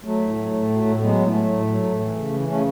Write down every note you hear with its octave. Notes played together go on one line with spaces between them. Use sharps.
F#3 A3
A2
F#3
A2
F#3
A2
F#3 G#3 B3
A2
A3
F#3
A2
F#3
A2
E3
C#3
E3
C#3 A3 C#4